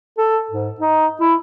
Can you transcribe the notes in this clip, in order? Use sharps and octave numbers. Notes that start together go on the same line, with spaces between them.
A4
G#2
D#4
E4